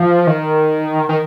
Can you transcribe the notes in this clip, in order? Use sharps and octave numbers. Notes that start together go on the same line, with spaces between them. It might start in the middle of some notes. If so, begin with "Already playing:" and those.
Already playing: F3
D#3
D#3